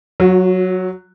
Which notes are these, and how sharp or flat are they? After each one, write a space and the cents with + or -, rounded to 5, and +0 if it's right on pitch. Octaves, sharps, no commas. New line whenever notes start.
F#3 +0 F#4 -40